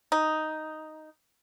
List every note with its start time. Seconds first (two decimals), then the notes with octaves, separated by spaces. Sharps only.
0.12 D#4